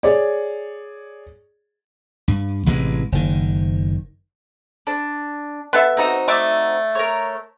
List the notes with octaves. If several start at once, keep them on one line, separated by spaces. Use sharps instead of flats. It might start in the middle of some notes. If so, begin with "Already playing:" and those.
G#4 C#5 D5
G2
A1 C3 E3 G#3
F#1 D#3
D4
B3 A4 E5
C4 D#4 F#4
A3 D5 E5
A#4 C#5